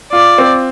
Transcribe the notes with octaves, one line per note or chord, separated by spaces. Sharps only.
F4 D5
C4